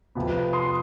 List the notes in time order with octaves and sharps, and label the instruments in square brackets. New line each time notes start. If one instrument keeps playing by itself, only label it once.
[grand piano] F2 C3 F3 B3
C6 D#6